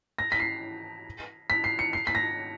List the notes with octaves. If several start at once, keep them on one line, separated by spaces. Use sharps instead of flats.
A#6
B6
C7
B6
C7
C#7
C7
B6
A#6